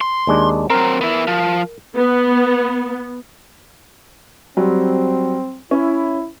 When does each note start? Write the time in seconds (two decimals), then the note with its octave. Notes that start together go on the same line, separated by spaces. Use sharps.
0.01 C6
0.27 D#2 G#3 D4
0.70 F#3 C4 A#4
1.01 B3 E4
1.27 F3
1.95 B3
4.57 F#3 G3 C4
5.71 C#4 E4